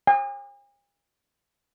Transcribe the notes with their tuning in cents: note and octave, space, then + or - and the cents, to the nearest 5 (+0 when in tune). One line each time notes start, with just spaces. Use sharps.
G#5 -45